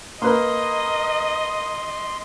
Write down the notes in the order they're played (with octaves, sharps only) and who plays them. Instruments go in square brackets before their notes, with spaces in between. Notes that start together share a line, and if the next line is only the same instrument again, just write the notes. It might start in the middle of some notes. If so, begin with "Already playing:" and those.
[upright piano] A#3 B4 [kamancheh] D#5 [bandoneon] C6